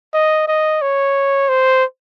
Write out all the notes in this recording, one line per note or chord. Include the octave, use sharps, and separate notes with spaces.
D#5
D#5
C#5
C5